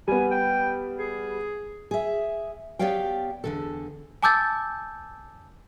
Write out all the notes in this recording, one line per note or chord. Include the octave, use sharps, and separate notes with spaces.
G3 B3 G#5
G5
G#4
G#4 E5
B3 G4 C#5 D5 F5 G5
E2 D3 A4
G#5 A5 D6 E6 G6 A6